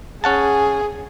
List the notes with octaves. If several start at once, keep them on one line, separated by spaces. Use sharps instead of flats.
C#4 G#4 F#5 A5